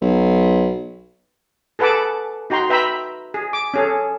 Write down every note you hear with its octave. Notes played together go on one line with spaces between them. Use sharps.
B1
G#4 A4 B4 F#5 A5 D6
D#4 F#4 G5 A#5 C6
B4 E5 G5 A#5 B5 E6
G#4
D6
C#4 G#4 A4